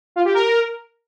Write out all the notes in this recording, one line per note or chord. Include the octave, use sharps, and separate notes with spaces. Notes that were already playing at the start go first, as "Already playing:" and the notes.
F4
G4
A#4